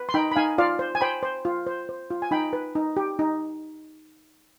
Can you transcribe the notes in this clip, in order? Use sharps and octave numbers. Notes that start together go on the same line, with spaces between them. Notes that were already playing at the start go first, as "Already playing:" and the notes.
Already playing: B4
C6
D#4 G5 B5
B5
D#4 F5 G#5
F4 D5 F5
C5
G#5
C5 G5 B5
C5
F4
C5
C5
F4
G#5
D#4 G5 B5
B4
D#4
G4
D#4